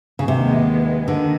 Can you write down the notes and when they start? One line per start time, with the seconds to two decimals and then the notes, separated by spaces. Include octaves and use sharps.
0.19 C#3
0.28 D#2 C3 D#3 G#3 B3
1.07 D3 D#3